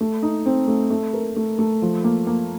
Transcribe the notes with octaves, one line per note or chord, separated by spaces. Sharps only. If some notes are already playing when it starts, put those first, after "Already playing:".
A3
D#4
C4
A3
A3
A#4
A3
A3
F3
A#3
A#3